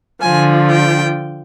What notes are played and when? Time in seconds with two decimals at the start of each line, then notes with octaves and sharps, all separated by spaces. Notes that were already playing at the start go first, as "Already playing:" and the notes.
0.21 D3 F3 G#5
0.71 G5